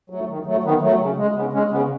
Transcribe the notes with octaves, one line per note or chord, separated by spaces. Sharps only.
F#3 A3
D#3
F#3 A3
D#3 B3
F#3 A3
C#3
G#3
C#3 B3
G#3 C#4
C#3 B3